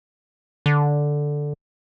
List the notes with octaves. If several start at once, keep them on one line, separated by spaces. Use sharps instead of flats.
D3